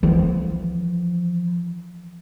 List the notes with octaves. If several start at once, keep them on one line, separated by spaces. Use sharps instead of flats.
E3 F3